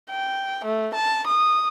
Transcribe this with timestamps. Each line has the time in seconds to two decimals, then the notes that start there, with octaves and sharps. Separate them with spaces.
0.11 G5
0.65 A3
0.94 A5
1.27 D#6